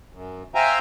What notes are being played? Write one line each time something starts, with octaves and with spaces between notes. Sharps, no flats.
F#2
C5 E5 F5 G5 G#5 A#5